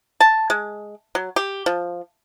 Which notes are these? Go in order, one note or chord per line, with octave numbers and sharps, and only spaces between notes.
A5
G#3
F#3
G4
F3